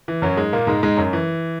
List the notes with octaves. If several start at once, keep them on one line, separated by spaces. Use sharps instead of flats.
E3
F#2 F#3
G#2 G#3
A#2 A#3
G#2 G#3
G#2 G#3
F#2 F#3
E3